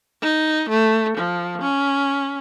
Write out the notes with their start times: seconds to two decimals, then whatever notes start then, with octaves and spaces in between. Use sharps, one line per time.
0.22 D#4
0.69 A3
1.17 F3
1.61 C#4